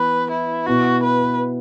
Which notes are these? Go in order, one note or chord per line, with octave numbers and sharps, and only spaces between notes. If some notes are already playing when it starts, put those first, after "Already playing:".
Already playing: E3 B3 B4
E4
B2 B3 E4 F#4
B4